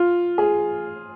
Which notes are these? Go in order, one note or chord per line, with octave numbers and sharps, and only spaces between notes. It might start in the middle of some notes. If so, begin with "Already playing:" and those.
Already playing: F4
G#4